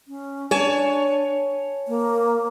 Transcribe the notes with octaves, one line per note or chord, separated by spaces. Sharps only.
C#4
D4 C#5 G#5 A5
A#3